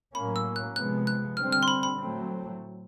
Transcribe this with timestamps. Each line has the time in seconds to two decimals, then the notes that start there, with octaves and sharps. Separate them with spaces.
0.15 A2 F#3 A#3 C#4 B5
0.36 E6
0.56 F#6
0.76 C3 F3 G#3 B3 F#6
1.07 F#6
1.37 D3 G3 C4 F6
1.53 F6
1.63 C6
1.68 B5
1.83 B5
1.98 A2 F#3 A3 C4